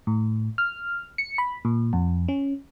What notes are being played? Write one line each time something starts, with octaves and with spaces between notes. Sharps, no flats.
A2
F6
C#7
B5
A#2
F2
C#4